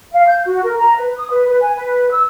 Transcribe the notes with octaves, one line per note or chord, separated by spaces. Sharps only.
F5
G6
F#4
A#4
A#5
B4
D#6
B4
B4
G#5
B4
E6